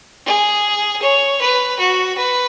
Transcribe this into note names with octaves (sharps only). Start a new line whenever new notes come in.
G#4
C#5
B4
F#4
B4